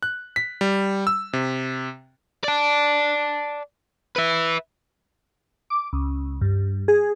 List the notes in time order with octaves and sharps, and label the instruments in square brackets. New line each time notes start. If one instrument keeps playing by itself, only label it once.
[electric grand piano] F#6
B6
G3
E6
C3
[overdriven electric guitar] D5 A5
B4 E5
[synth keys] D6
C#2
G2
G#4